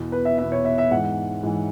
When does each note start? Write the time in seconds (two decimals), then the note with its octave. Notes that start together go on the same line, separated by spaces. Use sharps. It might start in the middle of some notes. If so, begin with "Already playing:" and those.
Already playing: E2 B2
0.12 B4
0.25 E5
0.38 E2 B2 E5
0.52 C#5
0.65 E5
0.78 E5
0.91 G#2 E3 F#5
1.43 G#2 E3